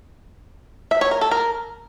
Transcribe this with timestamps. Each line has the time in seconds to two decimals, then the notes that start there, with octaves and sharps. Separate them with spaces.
0.91 E5
1.01 C#5
1.11 A#4
1.21 A4
1.31 A#4